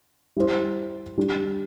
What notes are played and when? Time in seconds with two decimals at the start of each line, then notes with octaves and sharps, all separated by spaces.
0.36 G3 E4 G4 C5
1.18 G3 D4 G4